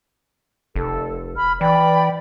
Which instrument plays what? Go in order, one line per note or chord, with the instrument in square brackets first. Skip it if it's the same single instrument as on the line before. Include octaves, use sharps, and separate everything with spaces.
[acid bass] F1 [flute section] A4
[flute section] B5 F6
[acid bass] E3 [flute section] D5 G5 B5